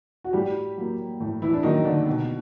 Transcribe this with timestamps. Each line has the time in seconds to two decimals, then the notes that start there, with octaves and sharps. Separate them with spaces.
0.24 F#4
0.33 A2 G3 G4
0.77 F#3 A#3
1.20 A2
1.42 E3 E4
1.53 D4
1.63 D#3 F#3 A#3 D#4
1.85 D3 D4
2.07 B2